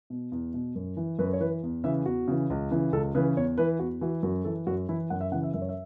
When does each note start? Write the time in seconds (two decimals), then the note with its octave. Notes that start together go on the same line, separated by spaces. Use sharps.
0.10 B2
0.32 E2
0.54 B2
0.75 F#2
0.97 E3
1.19 F#2 B4
1.33 C#5
1.40 E3 B4
1.63 E2
1.84 C#3 E3 E5
2.06 E2 F#4
2.28 C#3 E3
2.50 C#2
2.71 C#3 E3
2.93 C#2 A4
3.15 C#3 E3 B4
3.37 E2 C#5
3.58 E3 B4
3.79 E2 F#4
4.01 E3 F#4
4.23 F#2 F#4
4.45 E3 A4
4.67 F#2 F#4
4.89 E3 E4
5.10 F#2 F#5
5.21 E5
5.32 C#3 E3 F#5
5.43 E5
5.54 F#2 E5
5.62 C#5
5.69 E5